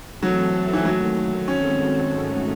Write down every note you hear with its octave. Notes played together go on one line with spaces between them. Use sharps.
E3 F#3 A3 C4 F#4 A4
E3
D#2 D#3 F#3 A3
D#3 G#3 C4 C#4 F#4 A4
G#2 D#3 A3 C#4 F#4